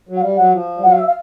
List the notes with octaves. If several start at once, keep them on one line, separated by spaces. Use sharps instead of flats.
F#3
F#5
G3 F5
F#3 F#5
F3
G3
F#3 F#5
F5
E5
F5